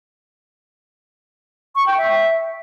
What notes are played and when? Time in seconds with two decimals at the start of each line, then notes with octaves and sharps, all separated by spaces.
1.76 C#6
1.87 G5
1.98 E5